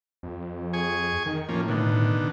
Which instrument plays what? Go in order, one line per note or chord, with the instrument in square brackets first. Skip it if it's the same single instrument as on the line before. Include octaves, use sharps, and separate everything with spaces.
[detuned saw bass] F2
[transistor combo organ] G#4 G#5 C#6
[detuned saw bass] D#3
[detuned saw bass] A2 [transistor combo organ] F3 A#3 C#4
[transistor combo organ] B2 D3 D#3